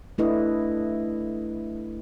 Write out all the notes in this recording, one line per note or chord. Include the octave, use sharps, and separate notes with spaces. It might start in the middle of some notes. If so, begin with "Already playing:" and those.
A3 D4 E4 A4 B4 D#5